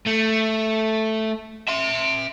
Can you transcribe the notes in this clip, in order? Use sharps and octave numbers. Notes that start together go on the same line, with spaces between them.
A3
E5 C6